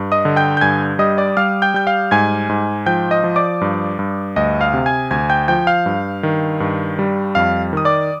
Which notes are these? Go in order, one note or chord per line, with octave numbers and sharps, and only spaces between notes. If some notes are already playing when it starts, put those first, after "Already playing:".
Already playing: G2
D#5 D#6
D3
G5 G6
G6
G2 G#5 G#6
G3 D#5 D#6
D5 D6
G3 F5 F6
G5 G6
G3 G6
F5 F6
G#2 G#5 G#6
G#2
F3 G5 G6
D#5 D#6
F3
D5 D6
G2
G2
D2 D#5 D#6
F5 F6
C3
G#5 G#6
D2 G#5 G#6
G5 G6
F3 G5 G6
F5 F6
G2
D#3
G2
G3
F2 F5 F6
D#3 D#6
D5 D6